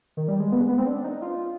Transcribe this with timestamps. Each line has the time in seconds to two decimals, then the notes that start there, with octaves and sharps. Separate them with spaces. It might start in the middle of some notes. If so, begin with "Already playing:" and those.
0.17 D#3
0.28 G3
0.40 G#3
0.52 B3
0.61 G#3
0.69 B3
0.78 C4
0.87 D4
1.04 D#4
1.22 F4